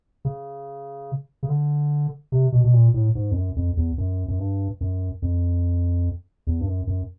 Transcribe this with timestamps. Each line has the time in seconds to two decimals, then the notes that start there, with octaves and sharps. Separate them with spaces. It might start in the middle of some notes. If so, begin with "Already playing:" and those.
0.25 C#3
1.43 C#3
1.49 D3
2.32 C3
2.52 B2
2.64 B2
2.73 A#2
2.94 A2
3.15 G#2
3.31 F2
3.36 F#2
3.56 F2
3.77 E2
3.98 F#2
4.28 F#2
4.39 G2
4.81 F#2
5.22 F2
6.47 E2
6.61 G2
6.67 F#2
6.87 F#2